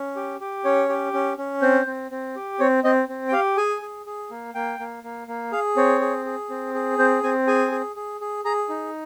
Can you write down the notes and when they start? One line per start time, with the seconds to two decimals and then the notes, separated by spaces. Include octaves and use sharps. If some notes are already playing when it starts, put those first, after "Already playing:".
Already playing: C#4
0.16 G4
0.40 G4
0.65 C#4 C#5
0.89 G4
1.14 C#4
1.38 C#4
1.62 C4 C5
1.87 C4
2.11 C4
2.36 G4
2.60 C4 C#5
2.84 C4 D#5
3.09 C4
3.28 G5
3.32 G4 F5
3.57 G#4 G#5
3.82 G#4
4.06 G#4
4.31 A#3
4.54 A#3 G5
4.79 A#3
5.04 A#3
5.28 A#3
5.52 G#4 F5
5.77 C4 C#5
6.01 G#4
6.26 G#4
6.50 C4
6.75 G#4
6.98 C4 C5
7.23 C4 G#5
7.47 G#4 G#5
7.72 G#4
7.96 G#4
8.21 G#4
8.45 G#4 A#5
8.69 D#4